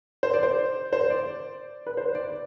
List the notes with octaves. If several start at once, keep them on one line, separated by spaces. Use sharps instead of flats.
C5
D5
C5
C5
D5
B4
C5
D5